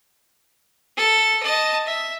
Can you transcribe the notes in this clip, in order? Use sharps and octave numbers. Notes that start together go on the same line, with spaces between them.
A4
D#5 A5
E5